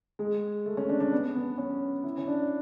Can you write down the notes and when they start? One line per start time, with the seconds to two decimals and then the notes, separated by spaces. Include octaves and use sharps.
0.19 G#3
0.66 A3
0.77 C#4
0.89 D4
1.00 D4
1.12 B3
1.35 B3
1.58 C#4
2.04 E4
2.18 C#4
2.28 D4